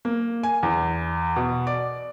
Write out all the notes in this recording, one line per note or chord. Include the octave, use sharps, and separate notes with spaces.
A#3
G#5
E2
B2
D5